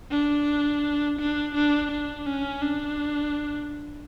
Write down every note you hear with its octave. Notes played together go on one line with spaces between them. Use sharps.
D4
D4
D4
D4
C#4
D4